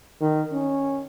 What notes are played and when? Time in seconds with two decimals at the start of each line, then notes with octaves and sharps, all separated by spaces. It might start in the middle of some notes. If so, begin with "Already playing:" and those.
0.21 D#3
0.53 C#4